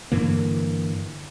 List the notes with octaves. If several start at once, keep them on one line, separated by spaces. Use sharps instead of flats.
G2 D3 E3 A#3